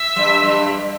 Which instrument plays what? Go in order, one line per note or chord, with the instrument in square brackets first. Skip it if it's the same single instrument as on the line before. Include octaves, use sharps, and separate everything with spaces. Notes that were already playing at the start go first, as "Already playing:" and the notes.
Already playing: [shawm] E5
[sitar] G2 G3
G2 G3